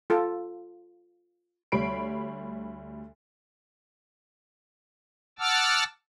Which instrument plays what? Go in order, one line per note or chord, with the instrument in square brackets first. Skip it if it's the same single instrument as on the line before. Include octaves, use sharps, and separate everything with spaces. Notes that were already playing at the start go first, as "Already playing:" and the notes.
[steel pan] F4 A4
[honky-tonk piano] D2 G3 C#5 B5 C7 D7
[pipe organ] F#5 A5 D6 E6 F6